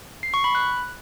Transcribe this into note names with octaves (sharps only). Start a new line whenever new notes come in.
C7
C#6
B5
F#6